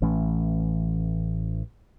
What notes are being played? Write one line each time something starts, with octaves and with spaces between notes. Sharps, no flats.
A1 E3 A3 C#4